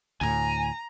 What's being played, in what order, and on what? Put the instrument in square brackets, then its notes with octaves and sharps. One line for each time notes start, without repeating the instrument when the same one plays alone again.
[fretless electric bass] D2 A2 [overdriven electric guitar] G#5 [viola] A#5